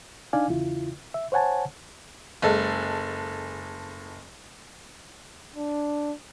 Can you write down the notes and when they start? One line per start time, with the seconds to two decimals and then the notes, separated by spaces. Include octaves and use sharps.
0.33 D4 D#4 D5 F5 G#5
0.50 E2 C#3 E4 F4
1.14 E5
1.32 C5 C#5 F#5 G#5 A5
2.42 F#1 G#3 A4
5.56 D4